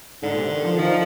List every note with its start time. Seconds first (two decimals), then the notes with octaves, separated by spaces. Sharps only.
0.22 G#2 D3
0.32 A#2
0.36 C3
0.50 D#3
0.65 F3
0.79 D#3 F3